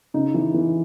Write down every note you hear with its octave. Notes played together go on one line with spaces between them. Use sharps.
C#3 D#4
E3
E3